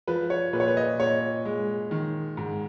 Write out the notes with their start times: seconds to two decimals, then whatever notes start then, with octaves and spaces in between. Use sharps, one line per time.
0.07 F3 B4
0.30 C#5
0.53 A#2 B4
0.60 C#5
0.68 B4
0.77 D#5
0.99 A#2 C#5
1.45 G#3
1.91 D#3
2.37 G#2